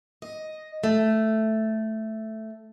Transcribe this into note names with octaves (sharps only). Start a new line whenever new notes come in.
D#5
A3